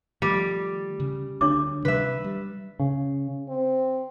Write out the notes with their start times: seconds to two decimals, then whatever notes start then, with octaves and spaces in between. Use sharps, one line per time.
0.22 D#3 F3 G3 A3
1.00 C#3
1.41 D2 D4 C#5 D6
1.85 C3 D#3 G3 B4 E5
2.24 G3
2.80 C#3
3.49 C4